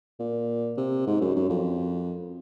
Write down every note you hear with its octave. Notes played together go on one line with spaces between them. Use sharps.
A#2
C3
G#2
F#2
F#2
F2